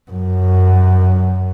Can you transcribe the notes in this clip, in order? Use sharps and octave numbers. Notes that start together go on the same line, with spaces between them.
F#2